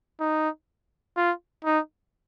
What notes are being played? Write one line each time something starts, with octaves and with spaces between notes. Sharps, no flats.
D#4
F4
D#4